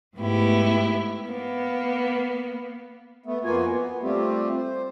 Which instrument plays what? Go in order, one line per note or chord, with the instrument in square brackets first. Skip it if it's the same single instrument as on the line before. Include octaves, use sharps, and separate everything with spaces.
[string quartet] G#2 A3 B3 E4 G4
A#3 B3
[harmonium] A3 B3
F2 A#3 B3 F4 F#4 G#5
B3
G3 A3 C4 F4 G4
C5